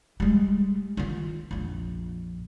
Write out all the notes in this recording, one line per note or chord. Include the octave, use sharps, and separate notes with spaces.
G3 G#3
D#3 F4
A#1 F2